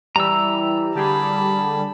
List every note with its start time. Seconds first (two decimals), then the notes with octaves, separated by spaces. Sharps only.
0.16 E3 G3 A#5 E6
0.95 D3 G3 G#4 A5 B5